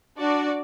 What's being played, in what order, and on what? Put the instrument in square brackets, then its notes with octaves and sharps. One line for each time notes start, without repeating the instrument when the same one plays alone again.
[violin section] D4 F#4 D5